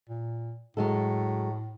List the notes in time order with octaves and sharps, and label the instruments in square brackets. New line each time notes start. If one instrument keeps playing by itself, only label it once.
[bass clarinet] A#2
[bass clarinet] A2 [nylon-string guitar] F#3 G#3 A4